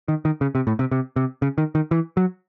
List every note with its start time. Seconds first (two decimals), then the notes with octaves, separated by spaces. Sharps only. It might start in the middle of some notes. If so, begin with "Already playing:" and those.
0.08 D#3
0.25 D#3
0.41 C#3
0.55 C3
0.67 A2
0.79 C3
0.91 C3
1.16 C3
1.42 C#3
1.58 D#3
1.75 D#3
1.91 E3
2.17 F#3